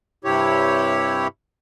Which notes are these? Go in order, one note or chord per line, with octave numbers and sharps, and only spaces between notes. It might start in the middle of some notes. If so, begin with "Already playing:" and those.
G2 C3 E4 G4 C#5